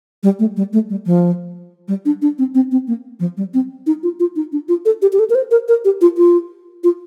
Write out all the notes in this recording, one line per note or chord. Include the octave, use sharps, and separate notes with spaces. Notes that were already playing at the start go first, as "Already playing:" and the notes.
G3
A3
G3
A3
G3
F3
G3
D4
D4
C4
C4
C4
A#3
F3
G3
C4
D#4
F4
F4
D#4
D4
F4
A4
G4
G4
A4
A#4
C5
A#4
A#4
G4
F4
F4
F4